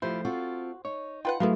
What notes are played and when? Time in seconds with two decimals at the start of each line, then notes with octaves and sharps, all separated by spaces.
0.02 F3 A3 E4 F4 G4 C5
0.25 C4 F4 F#4 A4
0.85 D#4 C#5
1.25 F4 B4 F#5 G5
1.40 F3 F#3 A3 B3 E4 G#4 F5